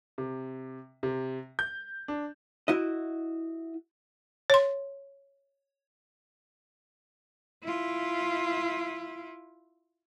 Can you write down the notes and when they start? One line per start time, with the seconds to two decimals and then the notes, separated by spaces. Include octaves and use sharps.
0.18 C3
1.03 C3
1.59 G6
2.08 D4
2.68 E4 F#4 D#5
4.50 C#5 C6
7.64 E4 F4